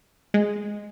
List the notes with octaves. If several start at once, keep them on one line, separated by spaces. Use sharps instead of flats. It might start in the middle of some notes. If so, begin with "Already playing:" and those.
G#3